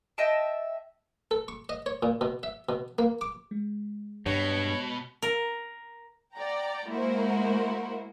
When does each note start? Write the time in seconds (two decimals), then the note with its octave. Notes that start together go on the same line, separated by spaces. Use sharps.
0.18 D#5 E5 G5 A5
1.31 A4
1.48 C#6
1.69 D#5
1.86 C#5
2.03 A#2
2.21 B2
2.43 E5
2.69 B2
2.99 A#3
3.21 D6
3.51 G#3
4.26 G2 B2 C#5
5.22 A#4
6.35 D5 F#5 G5 A#5
6.88 G#3 A#3 E4 F#4 A#4 C5